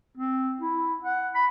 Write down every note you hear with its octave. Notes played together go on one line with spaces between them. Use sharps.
C4
E4
F#5
B5